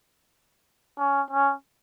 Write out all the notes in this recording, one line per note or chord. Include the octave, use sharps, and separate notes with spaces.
C#4
C#4